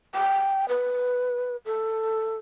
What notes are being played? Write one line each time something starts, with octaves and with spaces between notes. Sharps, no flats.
G5
B4
A4